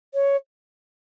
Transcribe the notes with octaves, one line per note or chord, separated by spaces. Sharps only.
C#5